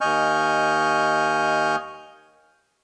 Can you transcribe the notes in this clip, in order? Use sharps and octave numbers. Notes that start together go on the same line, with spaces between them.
D#2 D#5 G#5 C#6 F6 G6